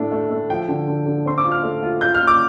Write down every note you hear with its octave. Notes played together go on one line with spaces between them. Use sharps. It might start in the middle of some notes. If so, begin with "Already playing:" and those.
Already playing: A2 A3 D4
A3
A3
F3 G5
D3
D3
D3
C4 C6
D6
F4
F6
A3
F4
F4 G6
F6
F4
D6